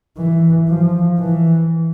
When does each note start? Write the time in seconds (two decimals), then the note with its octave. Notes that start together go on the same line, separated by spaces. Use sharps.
0.17 E3
0.68 F3
1.18 E3